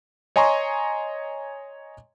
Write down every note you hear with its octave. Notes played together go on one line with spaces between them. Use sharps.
C#5 D#5 G#5 A#5 C6 C#6